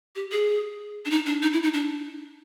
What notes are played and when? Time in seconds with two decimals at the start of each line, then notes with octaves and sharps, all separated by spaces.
0.16 G4
0.32 G#4
1.05 D4
1.11 D#4
1.26 D4
1.42 D#4
1.53 E4
1.63 D#4
1.74 D4